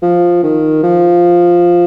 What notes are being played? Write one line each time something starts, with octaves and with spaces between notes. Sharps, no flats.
F3
D#3
F3